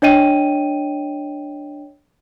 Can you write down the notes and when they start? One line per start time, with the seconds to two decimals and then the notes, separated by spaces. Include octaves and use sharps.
0.02 D4 C#5 D#5 G5 D#7